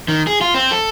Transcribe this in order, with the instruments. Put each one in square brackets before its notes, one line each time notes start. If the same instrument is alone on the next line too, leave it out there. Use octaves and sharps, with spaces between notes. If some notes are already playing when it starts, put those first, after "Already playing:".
[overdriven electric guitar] D#3
G#4
F4
C4
A4